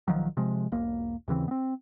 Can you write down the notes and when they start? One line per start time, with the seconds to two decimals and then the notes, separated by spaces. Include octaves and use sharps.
0.08 A#1 D#3 F3 F#3
0.37 C3 F3 G#3
0.72 E1 B1 A#3
1.28 D#2 C#3 E3 C4
1.48 B3 C4